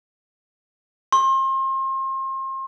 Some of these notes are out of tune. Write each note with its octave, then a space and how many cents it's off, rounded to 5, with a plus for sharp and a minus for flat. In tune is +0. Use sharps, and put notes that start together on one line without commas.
C6 +35